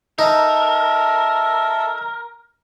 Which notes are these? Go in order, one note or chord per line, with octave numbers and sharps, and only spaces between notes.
D#4 A4 A#4 E5